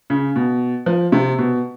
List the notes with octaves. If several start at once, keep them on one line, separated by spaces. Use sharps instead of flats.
C#3
B2
F3
C3
B2